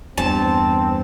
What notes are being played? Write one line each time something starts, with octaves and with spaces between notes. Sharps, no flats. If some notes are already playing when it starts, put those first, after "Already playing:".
E2 G2 C4 A5